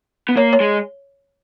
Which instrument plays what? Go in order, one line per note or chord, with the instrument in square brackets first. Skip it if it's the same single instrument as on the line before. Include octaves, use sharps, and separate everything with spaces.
[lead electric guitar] B3
[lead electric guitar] A#3 [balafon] C#5
[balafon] C#5
[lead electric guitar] G#3